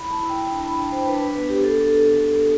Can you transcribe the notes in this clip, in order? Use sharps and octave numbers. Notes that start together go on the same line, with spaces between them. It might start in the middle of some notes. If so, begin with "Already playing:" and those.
Already playing: E4 B5
A5
E4
G5
D4 A5
B5
A5
D4 G5
C5
D4 B4
B4
B3 B4
G4
D4 A4